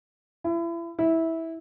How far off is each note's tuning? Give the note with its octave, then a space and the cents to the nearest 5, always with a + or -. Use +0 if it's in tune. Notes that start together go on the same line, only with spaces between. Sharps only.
E4 +35
E4 -15